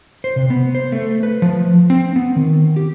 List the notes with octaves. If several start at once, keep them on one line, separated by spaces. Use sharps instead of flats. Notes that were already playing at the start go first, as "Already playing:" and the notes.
C5
C3
B3
C5
A3
B4
F3
C4
B3
D#3
G4